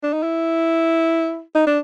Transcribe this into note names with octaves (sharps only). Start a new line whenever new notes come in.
D4
D#4
E4
D#4
D4